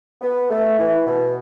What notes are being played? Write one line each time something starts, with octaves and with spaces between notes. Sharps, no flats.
B3
A3
E3
B2